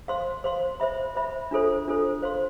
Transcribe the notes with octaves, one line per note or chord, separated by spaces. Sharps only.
C5 F5 C6
C5 F5 C6
C5 E5 B5
C5 E5 B5
D4 F4 A4 C5
D4 F4 A4 C5
C5 F5 C6